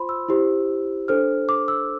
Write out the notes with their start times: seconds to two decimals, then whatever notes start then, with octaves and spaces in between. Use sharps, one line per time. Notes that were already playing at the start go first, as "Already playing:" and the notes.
Already playing: F4 C5 B5 C6
0.09 E6
0.29 E4 G4 C5
1.08 D4 A4 C5 F6
1.49 D6
1.68 E6